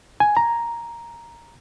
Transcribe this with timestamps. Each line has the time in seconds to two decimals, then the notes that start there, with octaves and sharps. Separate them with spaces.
0.20 G#5
0.37 A#5